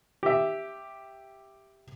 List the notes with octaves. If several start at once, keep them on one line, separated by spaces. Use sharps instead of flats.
G4 E5